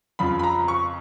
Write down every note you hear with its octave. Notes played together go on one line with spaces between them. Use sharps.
F2 C#3 F3 B5
B5
A#5
C#6